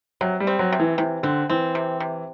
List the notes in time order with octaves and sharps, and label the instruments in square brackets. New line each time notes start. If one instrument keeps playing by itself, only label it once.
[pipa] C3 [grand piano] F#3
[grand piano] G3
[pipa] C4
[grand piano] F#3
[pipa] C3
[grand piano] E3
[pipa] C3 [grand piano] E3
[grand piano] D3 [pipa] C4
[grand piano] E3 [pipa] C4
[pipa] C3
C3